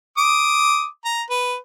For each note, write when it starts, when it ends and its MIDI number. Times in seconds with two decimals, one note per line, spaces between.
0.18 0.86 86
0.18 0.86 87
1.05 1.22 82
1.30 1.56 71